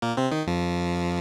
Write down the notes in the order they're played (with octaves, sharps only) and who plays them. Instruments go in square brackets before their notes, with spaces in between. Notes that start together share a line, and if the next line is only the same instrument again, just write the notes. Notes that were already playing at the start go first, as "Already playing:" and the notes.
[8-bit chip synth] A#2 A#3
C3 C4
D#3 D#4
F2 F3